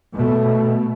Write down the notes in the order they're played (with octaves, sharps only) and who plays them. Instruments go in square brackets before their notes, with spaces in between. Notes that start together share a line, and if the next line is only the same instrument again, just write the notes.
[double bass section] B2 A3